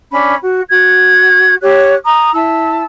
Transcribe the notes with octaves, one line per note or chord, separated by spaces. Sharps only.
C#4 D4 B5
F#4
F#4 G#6
G4 C#5 F#6
A#5 D#6
E4 A5 E6